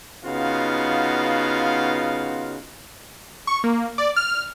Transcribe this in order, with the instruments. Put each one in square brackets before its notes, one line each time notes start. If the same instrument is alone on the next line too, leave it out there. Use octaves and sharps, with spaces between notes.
[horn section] C#3 B3 D#4 F4 F#4 F5
[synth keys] C#6
A#3
D5
F6